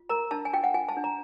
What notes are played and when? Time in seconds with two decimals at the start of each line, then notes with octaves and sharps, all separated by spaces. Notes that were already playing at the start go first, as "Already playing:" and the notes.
Already playing: F4
0.09 A#4 A#5
0.31 D4 A5
0.45 G#5
0.53 F4 G5
0.64 F#5
0.74 F4 G#5
0.89 A5
0.97 D4
1.04 A#5